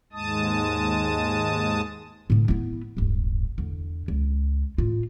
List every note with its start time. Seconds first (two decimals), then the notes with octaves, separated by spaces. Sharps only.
0.13 D#2 G#2 G#3 A5 D#6
2.30 A2 D3
2.48 B3 E4
2.97 D1 G1
3.58 E2 D3
4.08 C#2
4.78 A2 F4